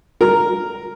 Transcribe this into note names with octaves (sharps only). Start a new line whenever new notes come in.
A#4